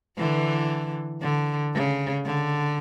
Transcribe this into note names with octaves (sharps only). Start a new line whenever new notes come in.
D3 E3
D3
C#3
D3